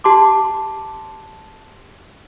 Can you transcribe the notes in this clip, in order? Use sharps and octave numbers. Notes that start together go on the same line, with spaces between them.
G4 A5 C6 D6